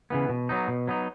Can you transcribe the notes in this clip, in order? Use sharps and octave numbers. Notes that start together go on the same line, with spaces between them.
C#3 E3 B3
B2
F#3 B3 D#4
B2
F#3 B3 D#4